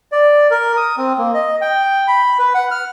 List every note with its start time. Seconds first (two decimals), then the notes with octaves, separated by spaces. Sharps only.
0.12 D5
0.51 A#4
0.77 D#6
0.97 C4
1.18 A#3
1.34 D#5
1.61 G5
2.08 B5
2.39 B4
2.54 F#5
2.71 F6